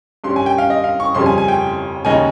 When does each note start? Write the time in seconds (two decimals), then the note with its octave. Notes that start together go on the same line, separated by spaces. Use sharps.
0.24 G2 G3 C#4 C6
0.36 G#5
0.46 G5
0.58 F5
0.70 D#5
0.84 F5
1.00 C#6
1.15 G1 F2 C#3 G3 C6
1.26 G#5
1.38 G#5
1.48 G5
2.05 D#2 C#3 G#3 D#4 G#5